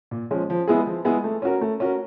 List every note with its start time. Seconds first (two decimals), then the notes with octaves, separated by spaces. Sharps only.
0.11 A#2
0.31 F3 G#3 C#4
0.50 F3
0.68 G#3 B3 E4 G#4
0.87 F3
1.05 G#3 B3 E4 G#4
1.24 A3
1.42 C#4 F#4 A#4
1.61 A3
1.80 C#4 F#4 A#4